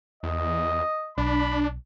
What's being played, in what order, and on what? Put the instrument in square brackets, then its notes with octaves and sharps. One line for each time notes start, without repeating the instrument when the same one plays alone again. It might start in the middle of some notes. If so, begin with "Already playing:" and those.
[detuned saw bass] E2 [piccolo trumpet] D#5
[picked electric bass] B1 [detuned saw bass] D4 [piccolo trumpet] B5